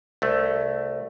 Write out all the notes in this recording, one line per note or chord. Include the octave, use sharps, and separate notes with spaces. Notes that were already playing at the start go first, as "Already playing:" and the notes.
C2 A3